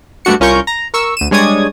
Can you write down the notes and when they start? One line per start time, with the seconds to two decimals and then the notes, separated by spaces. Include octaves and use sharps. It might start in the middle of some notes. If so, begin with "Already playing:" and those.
0.25 G2 A3 D4 F#4 C#7
0.40 C2 C#4 F4 A#4 C#6 G6
0.67 A#5
0.94 A#4 C#6 E6
1.17 D2 D#7 E7
1.31 G2 G#3 C#5 D5 D#6 G#6